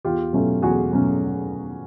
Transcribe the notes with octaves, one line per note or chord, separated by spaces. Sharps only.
E2 F4 G4
B2 F#3 A3 C#4
E2 F#4 G#4
B2 F#3 A3 C#4